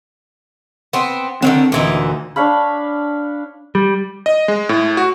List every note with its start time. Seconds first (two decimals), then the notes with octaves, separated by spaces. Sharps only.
0.93 B3 C4
1.42 D3 D#3 F#3 C4
1.72 D2 A#2 E3 D#4
2.36 D4 C#5 F5 B5
3.75 G3
4.26 D#5
4.48 G#3
4.69 A2
4.97 F#4